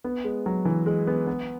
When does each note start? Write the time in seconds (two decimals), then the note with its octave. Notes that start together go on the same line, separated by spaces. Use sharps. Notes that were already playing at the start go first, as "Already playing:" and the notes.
0.04 B3
0.24 G#3
0.46 F#3
0.65 E3
0.86 G#3
1.07 B3
1.27 B3